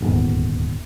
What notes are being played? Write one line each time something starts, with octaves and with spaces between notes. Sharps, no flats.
D#1 D2 G#2 B3